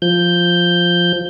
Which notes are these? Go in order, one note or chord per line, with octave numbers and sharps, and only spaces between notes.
F3 G6